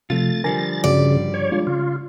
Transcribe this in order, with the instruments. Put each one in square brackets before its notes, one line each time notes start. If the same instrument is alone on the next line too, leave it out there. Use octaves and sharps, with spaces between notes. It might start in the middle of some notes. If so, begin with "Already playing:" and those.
[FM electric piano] C3 F3 [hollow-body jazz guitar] A3 F4 [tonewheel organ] A6
[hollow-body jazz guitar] D3 F3 G3 [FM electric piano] A#4 G#5 A#6
[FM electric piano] G2 F#4 [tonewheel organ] C#3 [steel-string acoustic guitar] D5
[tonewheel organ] C#5
[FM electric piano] G#3 D4 F4
[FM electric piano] C#3 [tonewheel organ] F4